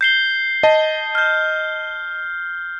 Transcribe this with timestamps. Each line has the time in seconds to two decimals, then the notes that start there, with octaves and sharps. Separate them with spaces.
0.01 G6 C7 G7
0.63 D#5 A5
1.15 F6 G6